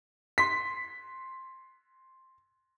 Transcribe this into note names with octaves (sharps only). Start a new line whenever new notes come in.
C6 B6